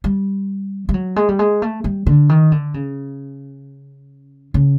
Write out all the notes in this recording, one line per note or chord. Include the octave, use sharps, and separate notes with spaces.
G3
G3
F#3
G#3
G3
G#3
A3
G3
D3
D#3
D3
C#3
C#3